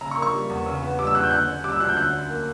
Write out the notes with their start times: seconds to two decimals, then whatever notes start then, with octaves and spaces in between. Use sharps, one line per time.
0.01 C#3 A#5
0.11 C#6
0.17 A#3
0.22 C#6
0.33 G3
0.50 E2
0.66 C#3
0.82 B3
0.99 G3 D6
1.07 E6
1.15 E2 F#6
1.23 G6
1.31 D3 F#6
1.48 C#4
1.64 G3 D6
1.72 E6
1.80 D2 F#6
1.88 G6
1.96 D3 F#6
2.13 C#4
2.29 A#3